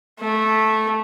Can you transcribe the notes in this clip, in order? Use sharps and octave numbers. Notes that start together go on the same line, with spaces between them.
A3